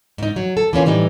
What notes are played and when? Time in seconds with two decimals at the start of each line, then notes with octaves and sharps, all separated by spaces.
0.18 G#2 D#4
0.36 F#3
0.57 A4
0.73 E3 A#3 C#4 F4
0.86 A2 E3 G3 D#4